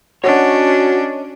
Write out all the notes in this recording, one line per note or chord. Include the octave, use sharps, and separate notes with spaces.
C#4 D4 F#4 C#5 D#5